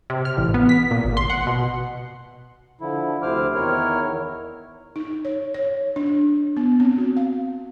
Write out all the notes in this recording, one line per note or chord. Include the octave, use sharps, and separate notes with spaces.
C3
F6
A1
B3
B6
A#2
G#1
C6
F#5
B2
D3 F3 E4
D2 C3 E4 C5 D6 F6
E2 D#3 E4 A#4 C#5 F6
D#4
C#5
C#5
D4
B3
C4
F#4
F5